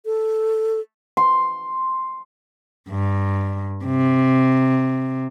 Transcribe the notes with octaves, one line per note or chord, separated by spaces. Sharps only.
A4
C6
G2
C3